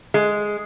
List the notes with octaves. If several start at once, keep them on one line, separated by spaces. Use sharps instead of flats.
G#3